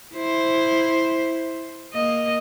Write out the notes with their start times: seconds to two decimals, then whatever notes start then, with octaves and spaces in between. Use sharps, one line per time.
0.15 E4 C5
1.93 A#3 D#5